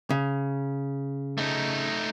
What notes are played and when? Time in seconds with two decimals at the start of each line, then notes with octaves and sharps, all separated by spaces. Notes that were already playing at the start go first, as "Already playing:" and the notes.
0.10 C#3
1.38 A3 D#4